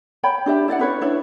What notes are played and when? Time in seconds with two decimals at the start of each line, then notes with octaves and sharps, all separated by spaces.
0.23 C#5 G5 B5
0.46 D4 G4 E5
0.68 E4 D5 D#5 F#5
0.79 C#4 B4 C#5
1.01 D4 E4 C#5